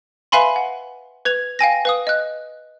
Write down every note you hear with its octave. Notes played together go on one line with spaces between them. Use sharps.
B4 E5 F5 G#5 B5 C6
F#5
B4 G#6 F7
F5 G5 G#5 A#6
B4 F5 D#6
D#5 F#6